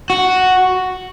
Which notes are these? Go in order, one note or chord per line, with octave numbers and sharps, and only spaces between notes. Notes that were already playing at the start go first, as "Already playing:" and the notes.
F#4